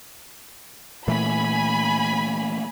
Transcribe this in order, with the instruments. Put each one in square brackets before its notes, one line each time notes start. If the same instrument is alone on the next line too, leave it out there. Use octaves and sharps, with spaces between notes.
[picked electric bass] A#2 E3 A3 [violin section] G#5 B5